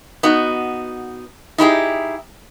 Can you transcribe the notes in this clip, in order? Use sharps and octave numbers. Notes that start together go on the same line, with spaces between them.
B3 D#4 F#4
D#4 E4 G4 G#4